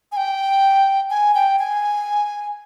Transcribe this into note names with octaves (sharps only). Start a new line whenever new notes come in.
G#5
G5
G#5
G5
G#5